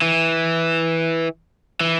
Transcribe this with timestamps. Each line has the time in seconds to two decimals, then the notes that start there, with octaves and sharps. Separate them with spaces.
0.02 E3
1.81 E3